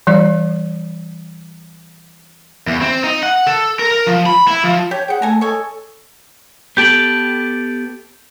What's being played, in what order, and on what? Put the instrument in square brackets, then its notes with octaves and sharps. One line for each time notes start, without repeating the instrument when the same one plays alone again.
[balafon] E3 G3 D5
[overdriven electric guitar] E2
C4
D#4
F#5
A4
A#4
A#4
F3
B5
E4
F3
[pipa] G4 [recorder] C#5
[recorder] G#4 [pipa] F#5 G5
[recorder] A3 [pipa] A4 G#5 A#5
[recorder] A4 [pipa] C#5 D#5 G#5
[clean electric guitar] B3 G4 A4 [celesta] G6 D7 F#7